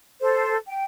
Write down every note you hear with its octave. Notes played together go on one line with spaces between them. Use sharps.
A4 C5
G5